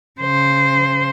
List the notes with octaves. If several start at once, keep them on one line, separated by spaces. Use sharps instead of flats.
C#3 C5